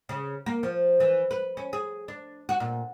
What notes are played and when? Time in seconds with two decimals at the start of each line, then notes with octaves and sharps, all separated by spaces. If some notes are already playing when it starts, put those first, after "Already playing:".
0.09 C#3
0.46 A#3
0.63 F3
1.00 E3
1.31 B4
1.57 C#4
1.73 G#4
2.08 D4
2.49 F#4
2.60 A#2